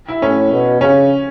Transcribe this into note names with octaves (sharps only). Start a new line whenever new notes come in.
E4
A2 C#4
B2
C#3 C#4